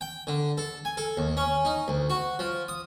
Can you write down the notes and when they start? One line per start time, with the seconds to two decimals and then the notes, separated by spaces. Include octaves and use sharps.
0.01 G5
0.27 D3
0.58 A4
0.85 G#5
0.97 A4
1.17 D#2
1.37 C#4
1.65 D#4
1.88 D2
2.10 F#4
2.39 F3
2.68 D#6